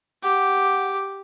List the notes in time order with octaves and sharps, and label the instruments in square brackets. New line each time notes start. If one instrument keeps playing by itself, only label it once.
[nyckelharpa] G4 [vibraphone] F#5